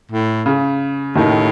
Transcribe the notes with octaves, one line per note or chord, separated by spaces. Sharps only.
A2
C#3
D#2 A2 D#3